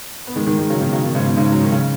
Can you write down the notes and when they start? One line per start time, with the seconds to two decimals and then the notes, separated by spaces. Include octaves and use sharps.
0.27 B3
0.36 D#3 G#3
0.47 D#3 G#3
0.58 D#3 G#3
0.70 C#3 F#3
0.81 B2 D#3
0.93 C#3 F#3
1.04 B2 D#3
1.15 G#2 C#3
1.26 B2
1.37 G#2 C#3
1.52 F#3
1.61 D#3
1.72 C#3